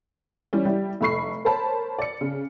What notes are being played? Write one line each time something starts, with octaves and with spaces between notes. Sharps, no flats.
E3 G3 C#4
G3 E4 G4
F1 A3 B5 C#6 C7
A#4 C5 C#5 A5 B5
D5 C#7
C#3